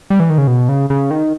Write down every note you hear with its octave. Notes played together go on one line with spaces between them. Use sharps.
G3
E3
D#3
C#3
B2
C#3
C#3
D#3